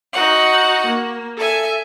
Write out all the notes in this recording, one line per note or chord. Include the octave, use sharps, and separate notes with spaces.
D#4 F#4 F#5
A#3
A4 E5 G#5